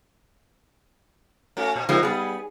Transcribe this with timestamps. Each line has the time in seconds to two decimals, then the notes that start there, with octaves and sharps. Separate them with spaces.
1.57 A3 C#4 F#4
1.76 A#2
1.89 F3 G#3 A#3 C4 D#4
2.03 G3 B3 G#4